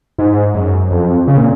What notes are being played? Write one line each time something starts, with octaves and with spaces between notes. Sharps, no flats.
G#2
F#2
F2
C#3
A#2